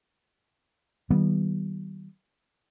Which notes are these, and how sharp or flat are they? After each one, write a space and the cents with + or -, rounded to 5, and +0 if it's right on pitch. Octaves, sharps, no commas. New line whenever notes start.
D#3 +0 G3 -40 B3 -20